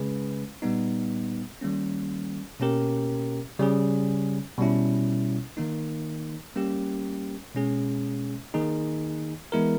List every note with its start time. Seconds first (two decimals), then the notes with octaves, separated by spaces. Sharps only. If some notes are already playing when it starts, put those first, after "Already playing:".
Already playing: C#3 G#3 C#4 G#4 B4
0.62 A#2 G3 B3 D#4
1.62 D#3 G3 A#3 C#4
2.60 B2 A#3 C#4 G4 A#4
3.59 C#3 G3 C#4 G#4
4.58 B2 G3 C#4 E4
5.57 D#3 A#3 D#4
6.56 G3 A#3 C#4 G4
7.55 B2 G#3 C#4 G#4
8.54 D#3 A#3 D#4 G#4
9.52 E3 G#3 B3 E4 A#4